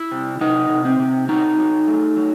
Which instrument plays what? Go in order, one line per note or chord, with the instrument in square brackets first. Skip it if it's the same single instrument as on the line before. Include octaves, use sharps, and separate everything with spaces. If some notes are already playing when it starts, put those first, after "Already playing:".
Already playing: [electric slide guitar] E4
C3
C3 D#4
C3
C4
C3
F#3 D#4
F#3
A3
F#3